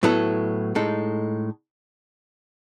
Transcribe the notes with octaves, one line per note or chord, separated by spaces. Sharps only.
A2 F#3 B3 E4 A4
A2 G#3 D#4 A4